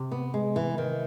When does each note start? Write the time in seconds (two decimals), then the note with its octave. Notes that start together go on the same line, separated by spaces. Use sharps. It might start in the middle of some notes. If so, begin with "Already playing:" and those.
Already playing: C3
0.11 B3
0.34 G#3
0.56 E3
0.78 D#3